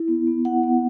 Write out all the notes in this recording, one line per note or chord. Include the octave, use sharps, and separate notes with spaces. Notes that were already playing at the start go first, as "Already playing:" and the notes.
Already playing: E4
B3
B3
E4 F#5
B3